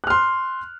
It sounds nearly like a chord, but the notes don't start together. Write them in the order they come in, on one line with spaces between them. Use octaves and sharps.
F#6 F6 C6